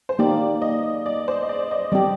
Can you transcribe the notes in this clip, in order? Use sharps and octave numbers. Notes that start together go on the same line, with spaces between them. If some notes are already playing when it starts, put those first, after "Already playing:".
C5
A#3 D#4 G4 D5
D#5
D5
C5
D#5
D5
D#5
G3 C4 G4 D5